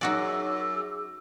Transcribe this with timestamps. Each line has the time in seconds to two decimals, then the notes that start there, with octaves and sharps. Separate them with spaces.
0.01 F#2 D#4 F#4 G#4 D5 D6 E6